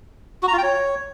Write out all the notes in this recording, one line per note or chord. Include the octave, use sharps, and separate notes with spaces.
F#4
A#5
F4
G5
C#5